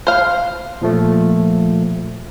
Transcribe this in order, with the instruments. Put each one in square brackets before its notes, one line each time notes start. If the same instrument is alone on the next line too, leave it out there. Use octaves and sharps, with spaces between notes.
[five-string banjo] C5 F5
[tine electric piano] A#2 F3 A3